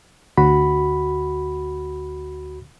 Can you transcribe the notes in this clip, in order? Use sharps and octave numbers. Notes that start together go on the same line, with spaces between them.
D2 F#4 B5